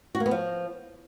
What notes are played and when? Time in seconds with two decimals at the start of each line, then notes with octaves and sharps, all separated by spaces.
0.15 F#4
0.20 A#3
0.26 B3
0.31 F3